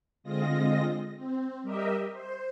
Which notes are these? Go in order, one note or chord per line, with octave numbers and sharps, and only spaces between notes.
D3 G#3 C4 F4 D#5 A#6
C4
G3 G4 A#4 D#5 E5
C5